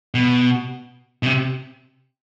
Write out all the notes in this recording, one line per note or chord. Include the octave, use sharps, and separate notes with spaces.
B2
B2
C3